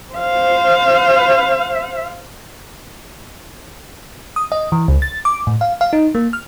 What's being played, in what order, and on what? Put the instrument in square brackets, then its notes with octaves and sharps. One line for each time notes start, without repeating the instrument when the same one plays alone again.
[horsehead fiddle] C5 F5
[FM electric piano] D#6
D#5
E3
C#2
A6
D6
A2
F5
F5
D#4
A#3
F6